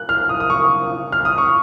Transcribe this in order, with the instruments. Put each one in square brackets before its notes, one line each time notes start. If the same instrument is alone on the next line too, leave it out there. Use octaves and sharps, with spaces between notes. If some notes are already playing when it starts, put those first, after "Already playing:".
Already playing: [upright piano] F#6
F6
D#6
D#6
C#6
F6
D#6
C#6